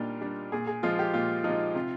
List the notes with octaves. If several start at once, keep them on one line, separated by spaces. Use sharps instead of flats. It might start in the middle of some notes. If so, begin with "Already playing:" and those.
Already playing: A#2 G3 D4 D#4 F4
G3 D4
A#2 G#4
G#4
F3 G#3 F4
G4
A#2 F4
F3 D#4
G#3
C3 F4